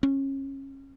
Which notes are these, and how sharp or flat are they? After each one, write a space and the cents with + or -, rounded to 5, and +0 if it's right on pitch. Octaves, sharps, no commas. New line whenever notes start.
C#4 -25